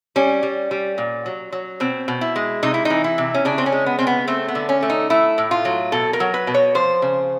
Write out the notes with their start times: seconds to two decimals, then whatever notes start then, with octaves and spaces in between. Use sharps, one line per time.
0.16 G3 C#4
0.43 G3
0.71 G3
0.98 A#2
1.26 F#3
1.52 F#3
1.80 B2 C4
2.08 B2
2.21 E4
2.36 G#3
2.63 C3 D#4
2.74 E4
2.85 E3 D#4
3.04 E4
3.18 C3
3.34 C#4
3.45 C#3 D4
3.58 C4
3.66 C#4
3.72 G#3
3.86 B3
3.99 C#3 C4
4.07 B3
4.27 A3 C4
4.48 B3
4.55 D3
4.69 C#4
4.83 A3
4.90 D#4
5.10 A3 E4
5.38 A2
5.51 F4
5.65 F#3
5.92 B2 A4
6.13 A#4
6.20 F#3
6.34 B4
6.47 B2
6.54 C#5
6.75 F3 C5
7.02 C#3